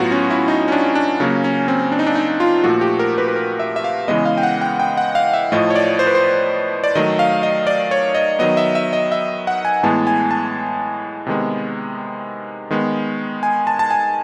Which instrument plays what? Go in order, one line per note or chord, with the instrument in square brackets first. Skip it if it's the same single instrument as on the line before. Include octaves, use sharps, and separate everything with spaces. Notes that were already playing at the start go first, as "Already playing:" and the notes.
Already playing: [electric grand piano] A2 F#3 B3 F4 F#4
C#4
E4
D#4
C#4
D4
D4
C#3 F#3 A#3 C#4
C#4
C4
D4
D#4
D4
D#4
F4
A#2 F3 A3 F#4
G4
A#4
B4
B4
A#4
E5
E5
F5
C#3 E3 G#3 B3 D#5
F5
G5
F#5
G5
G5
F#5
F5
E5
A2 F3 A3 D#5
C#5
D5
C5
B4
C5
D5
D#3 F#3 A3 D#5
F5
D#5
D5
C#5
D#5
D#3 F#3 B3 D#5
E5
E5
D#5
E5
F#5
G#5
A2 E3 G#3 B3 A5
G#5
A5
C3 D#3 G#3 B3
D#3 G#3 B3
G#5
A5
A5
G#5